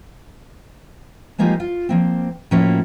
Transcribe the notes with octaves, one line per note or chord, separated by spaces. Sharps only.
F3 G#3 A#3 D#4 F4 G4
F4
F3 A#3 C4
A2 F3 A#3 C#4 E4 F#4